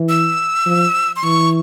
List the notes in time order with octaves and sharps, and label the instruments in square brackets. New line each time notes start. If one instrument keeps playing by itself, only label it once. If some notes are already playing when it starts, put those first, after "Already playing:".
Already playing: [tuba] E3
[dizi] E6
[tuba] F3
[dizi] C6
[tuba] E3 [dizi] C#6